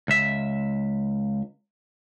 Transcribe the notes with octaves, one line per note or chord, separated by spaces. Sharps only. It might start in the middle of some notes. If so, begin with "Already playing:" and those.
C#2 E5